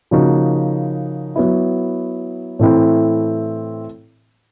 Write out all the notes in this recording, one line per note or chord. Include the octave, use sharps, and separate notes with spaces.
C#3 F3 A#3 D#4 F#4
F#3 B3 E4
A2 E3 A3 C4 E4